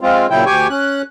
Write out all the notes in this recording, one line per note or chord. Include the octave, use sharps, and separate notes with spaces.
G#3 C4 F4
A#2 C#3 F#3 E4 G5
D2 G4 G5 G#5 C#6
C#4 F#6